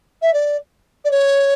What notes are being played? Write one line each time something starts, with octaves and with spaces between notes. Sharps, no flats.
E5
D5
D5
C#5